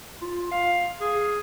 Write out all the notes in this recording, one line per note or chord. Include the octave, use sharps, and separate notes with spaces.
F4
F5
G#4